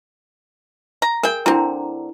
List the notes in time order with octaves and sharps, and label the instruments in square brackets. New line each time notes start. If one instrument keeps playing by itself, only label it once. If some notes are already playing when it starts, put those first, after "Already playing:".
[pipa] A#5
[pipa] G#4 G5 [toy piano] A#4
[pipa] D3 C4 [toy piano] D4 E4 A#5